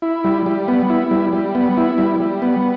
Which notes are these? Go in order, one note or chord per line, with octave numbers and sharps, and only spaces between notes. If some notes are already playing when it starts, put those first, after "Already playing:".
E4
G3
G3
B3
E4
G3
G3
B3
E4
G3
G3
B3